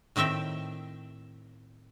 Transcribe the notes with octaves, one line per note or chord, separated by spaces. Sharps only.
A2 D#3 C4 E5 G5